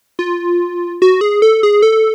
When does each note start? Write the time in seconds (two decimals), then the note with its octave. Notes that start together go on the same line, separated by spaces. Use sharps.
0.19 F4
1.02 F#4
1.21 G#4
1.42 A4
1.63 G#4
1.82 A4